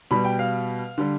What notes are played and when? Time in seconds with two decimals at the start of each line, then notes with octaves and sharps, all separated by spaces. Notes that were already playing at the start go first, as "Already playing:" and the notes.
0.11 B2 G3 B5
0.25 G5
0.39 F5
0.98 D3 G3